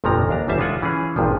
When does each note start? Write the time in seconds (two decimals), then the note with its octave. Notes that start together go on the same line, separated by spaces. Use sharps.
0.04 G1 F2 A#2 F3 F#3 A#5
0.29 D#2 D4 A#5
0.48 G1 E2 G3 C5 E5 A5
0.59 G#3 F4 F#5 G#5
0.82 E3 C#4 F4 G#4
1.16 G#1 G2 A#2 F3